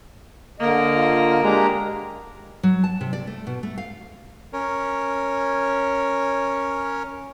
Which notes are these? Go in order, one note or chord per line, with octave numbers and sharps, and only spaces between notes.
D3 A#3 A#4 D#5
F4
G#3 D4 G4 A#5
F#3
A5
C3
D5
A3
B2
A3
F5
C#4 A#4 C#5